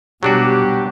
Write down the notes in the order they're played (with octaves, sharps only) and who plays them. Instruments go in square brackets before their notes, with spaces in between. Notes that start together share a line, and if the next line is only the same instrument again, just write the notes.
[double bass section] B2 G3 [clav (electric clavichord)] F#3 D4 F#4 [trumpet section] G4